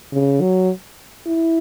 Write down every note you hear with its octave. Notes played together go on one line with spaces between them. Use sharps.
C#3
F#3
E4